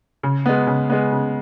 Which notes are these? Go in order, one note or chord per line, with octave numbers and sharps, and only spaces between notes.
C#3
G#3 B3
C#3
G#3 B3
C#3